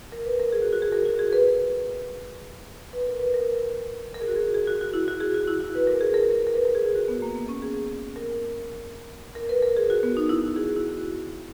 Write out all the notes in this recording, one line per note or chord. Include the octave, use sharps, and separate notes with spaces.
A#4
B4
A#4
G#4
F#4
F#4
G#4
A#4
F#4
G#4
B4
B4
A#4
B4
A#4
A#4
G#4
F#4
G#4
G#4
F#4
F#4
E4
F#4
G#4
F#4
E4
F#4
B4
A#4
G#4
A#4
A#4
B4
A#4
G#4
G#4
F#4
B3
A#3
B3
C#4
G#4
A#4
A#4
B4
A#4
G#4
F#4
B3
D#4
E4
F#4
G#4
F#4
E4
F#4